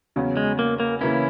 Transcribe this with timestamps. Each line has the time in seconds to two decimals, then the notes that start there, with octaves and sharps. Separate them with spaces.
0.16 E2 C#3 F#3 C#4
0.37 G#3
0.59 A#3
0.80 A#3
1.01 C#3 E3 A#3 C#4 E4